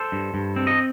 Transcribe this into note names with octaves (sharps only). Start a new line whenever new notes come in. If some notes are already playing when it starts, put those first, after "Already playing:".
Already playing: A4 C5
G2
G2
C4
D#5